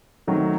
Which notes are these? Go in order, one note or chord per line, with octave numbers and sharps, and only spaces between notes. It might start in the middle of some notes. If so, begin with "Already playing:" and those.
D#3 F#3 A3 C4 F#4